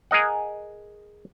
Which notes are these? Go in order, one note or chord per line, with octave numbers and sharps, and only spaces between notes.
G#4 A#4 D#5 F#5